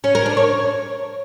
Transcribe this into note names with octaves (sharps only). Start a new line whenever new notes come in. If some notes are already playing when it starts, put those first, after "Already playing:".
C#4
A#4
D4
C#5